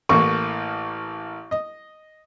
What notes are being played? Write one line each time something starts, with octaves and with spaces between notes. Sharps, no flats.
A1 A2 A#3 C#6
D#5